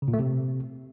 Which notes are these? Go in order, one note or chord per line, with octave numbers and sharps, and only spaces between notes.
C#3
A#2
A3
C3